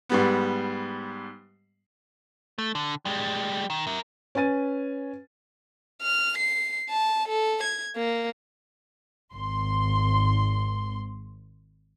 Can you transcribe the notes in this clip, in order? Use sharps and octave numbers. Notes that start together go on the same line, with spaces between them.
G#2 G3 B3
A3
D3
G3 G#3
D#3
A#4 E5
C#4 B4 G#5 A6 D#7
F6
C7
A5
A4
G#6
A#3
G#1 C6